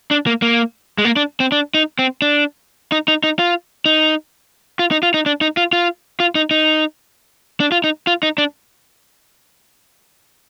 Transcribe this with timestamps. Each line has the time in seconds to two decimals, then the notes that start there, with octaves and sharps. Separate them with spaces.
0.11 D4
0.27 A#3
0.42 A#3
0.98 G#3
1.05 A#3
1.16 D4
1.40 C4
1.52 D4
1.74 D#4
1.99 C4
2.22 D4
2.92 D#4
3.08 D#4
3.24 D#4
3.39 F4
3.86 D#4
4.79 F4
4.91 D#4
5.03 F4
5.14 D#4
5.26 D4
5.41 D#4
5.57 F4
5.73 F4
6.20 F4
6.35 D#4
6.51 D#4
7.60 D4
7.72 F4
7.84 D#4
8.07 F4
8.23 D#4
8.38 D4